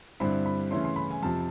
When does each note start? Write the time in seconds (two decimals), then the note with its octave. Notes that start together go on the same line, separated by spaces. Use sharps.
0.20 G2 D3 G3 C4 E4 B5
0.46 B5
0.71 C#3 E3 A3 C#4 E4 C6
0.85 C6
0.96 B5
1.11 G#5
1.23 F2 C3 F3 A5